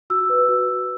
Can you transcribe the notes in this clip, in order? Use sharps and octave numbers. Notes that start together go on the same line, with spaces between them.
F#4 E6
B4
F#4
B4